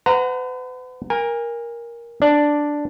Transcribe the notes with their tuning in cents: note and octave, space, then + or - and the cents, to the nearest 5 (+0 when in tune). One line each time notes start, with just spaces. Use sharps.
B4 +45 F#5 +0 A#5 -15
A#4 +10 G#5 -30
D4 +0 D5 +0